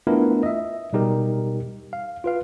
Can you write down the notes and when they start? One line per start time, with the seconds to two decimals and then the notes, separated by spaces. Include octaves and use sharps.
0.07 A3 B3 D4 E4 F4 A#4
0.43 D#5 E5
0.93 B2 G3 D#4 G4 A#4
1.93 F5
2.24 F4 B4 F5